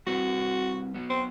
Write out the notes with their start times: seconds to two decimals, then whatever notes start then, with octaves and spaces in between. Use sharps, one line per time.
0.07 G3 C4 E4 F#4 B4
0.94 F#3 B3 F#4
1.10 C4